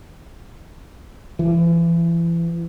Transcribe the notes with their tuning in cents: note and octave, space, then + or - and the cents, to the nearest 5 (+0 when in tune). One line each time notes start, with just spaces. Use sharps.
E3 +35